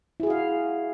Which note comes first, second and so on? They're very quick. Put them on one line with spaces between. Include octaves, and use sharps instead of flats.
E4 G#4 F#4 F5